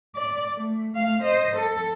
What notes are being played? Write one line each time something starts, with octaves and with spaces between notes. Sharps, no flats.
D5
A3
A3 F5
C5 D#5
A4